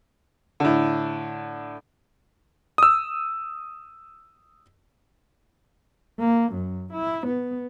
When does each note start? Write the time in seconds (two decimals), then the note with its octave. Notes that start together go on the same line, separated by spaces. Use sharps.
0.60 A2 D3
2.78 D#6 E6
6.20 A#3
6.53 F#2
6.93 E4
7.27 B3